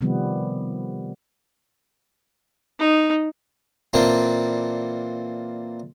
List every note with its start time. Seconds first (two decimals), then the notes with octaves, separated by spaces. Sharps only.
0.01 C3 D#3 F3 G3 B3
2.80 D#4
3.93 A#2 E3 A#3 C4 D4